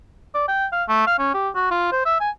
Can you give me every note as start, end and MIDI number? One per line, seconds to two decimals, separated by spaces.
0.35 0.44 74
0.48 0.66 79
0.73 0.84 77
0.89 1.06 57
1.07 1.17 77
1.19 1.33 61
1.34 1.49 67
1.55 1.70 66
1.71 1.92 65
1.92 2.04 72
2.06 2.17 76
2.20 2.30 80